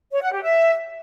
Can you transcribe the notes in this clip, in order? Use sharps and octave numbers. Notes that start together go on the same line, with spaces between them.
C#5
F#5
G4
E5